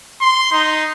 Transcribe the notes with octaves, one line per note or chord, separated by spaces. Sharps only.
C6
D#4